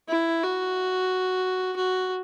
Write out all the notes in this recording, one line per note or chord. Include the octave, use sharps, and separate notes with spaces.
E4
F#4
F#4